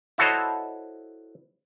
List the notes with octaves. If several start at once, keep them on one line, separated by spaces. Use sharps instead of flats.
E4 F#4 A4 C5 C#5 D#5